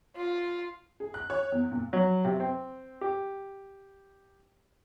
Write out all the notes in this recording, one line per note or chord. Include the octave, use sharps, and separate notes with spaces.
F4
G#4
F#6
C#5
E2
A#2
F#3
C3
C4
G4